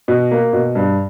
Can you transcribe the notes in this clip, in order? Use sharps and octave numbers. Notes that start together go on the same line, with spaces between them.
B2
A#3
B2
G2